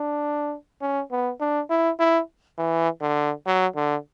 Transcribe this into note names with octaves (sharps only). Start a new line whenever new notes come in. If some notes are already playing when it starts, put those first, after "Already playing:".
Already playing: D4
C#4
B3
D4
E4
E4
E3
D3
F#3
D3